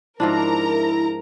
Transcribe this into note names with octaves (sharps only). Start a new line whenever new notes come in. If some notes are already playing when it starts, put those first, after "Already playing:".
G#2 F3 D4 E4 A#4 A#5